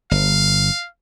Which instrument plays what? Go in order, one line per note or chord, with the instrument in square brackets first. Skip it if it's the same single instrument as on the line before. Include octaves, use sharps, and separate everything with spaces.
[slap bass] G1 [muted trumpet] F5